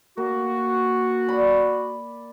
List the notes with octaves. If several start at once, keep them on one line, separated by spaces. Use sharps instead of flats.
A#3 F#4
D5 B5